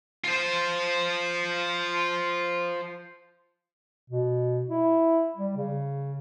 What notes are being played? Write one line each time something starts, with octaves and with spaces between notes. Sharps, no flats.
F4 C5
B2
E4
G3
C#3